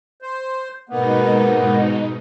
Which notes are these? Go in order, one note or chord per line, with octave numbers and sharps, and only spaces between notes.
C5
G#2 B2 A#3 B3 D#4